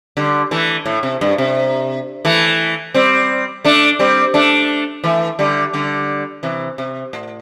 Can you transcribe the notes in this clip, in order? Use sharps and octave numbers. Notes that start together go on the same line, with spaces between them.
D3 G3
E3 A3
A2
C3
G2
C3
E3 A3
G3 C4
A3 D4
G3 C4
A3 D4
E3 A3
D3 G3
D3 G3
C3 E3
C3
A2